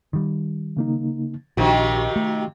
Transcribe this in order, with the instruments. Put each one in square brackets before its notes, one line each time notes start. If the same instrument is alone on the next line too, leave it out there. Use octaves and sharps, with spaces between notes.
[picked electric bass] D#3 G3
[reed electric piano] C#3 A#3 D#4
[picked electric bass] A#1 D4 [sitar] C3 D#3 F3 [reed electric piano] F#4 G4 C#6
[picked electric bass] A3